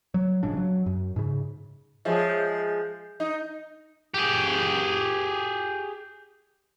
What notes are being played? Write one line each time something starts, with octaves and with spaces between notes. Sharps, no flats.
F#3
A#1 G#2 C#3 D4
F#3
F#2
G#2 C#3
F3 G#3 G#4 C#5 E5
G6
D#4
G4 G#4